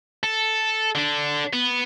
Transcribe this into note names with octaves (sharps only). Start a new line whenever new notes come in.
A4
D3 D4
B3